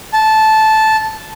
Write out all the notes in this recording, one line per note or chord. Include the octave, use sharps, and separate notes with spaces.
A5